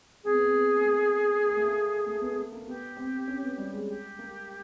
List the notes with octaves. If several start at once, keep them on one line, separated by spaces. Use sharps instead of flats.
C4 G#4
B3
C4
B3
A#3
A3
A#3
A3
A#3
A3
B3
B3
A#3
B3 G4
C4
C#4
B3
G3
G#3
G4
A#3